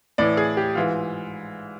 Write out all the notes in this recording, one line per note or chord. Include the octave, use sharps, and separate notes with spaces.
A2 E3 D5
G#4
G4
G#2 E3 F4